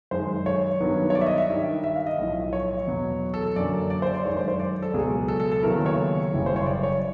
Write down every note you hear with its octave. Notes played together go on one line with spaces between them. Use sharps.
F#2 D#3 G#3 C5
C#5
G2 D#3 F#3 B3
C#5
D5
E5
D#5
E5
G2 D#3 G3
E5
F5
D#5
B1 A2 F3
C#5
E2 B2 F#3
A4
F#2 D3 F#3 A#3 C#4 D5
D5
C5
D5
F#2 D#3 G#3 C#5
C5
C5
D5
A4
C#2 B2 F#3 G#4
A4
A4
A4
D#2 C#3 F#3 B3 E4 A#4
C#5
F#1 F#2 C#3 E3 G3
C5
C#5
D5
C#5